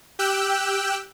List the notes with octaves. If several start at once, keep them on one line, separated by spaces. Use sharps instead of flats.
G4 G5 E6 F#6